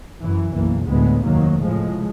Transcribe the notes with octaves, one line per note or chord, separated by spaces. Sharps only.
F#2 E3
F#1 B1 E3 A#3
D2 A2 G#3 B3
F1 D#2 D#3 F#3 A#3
C#2 A2 F3 G#3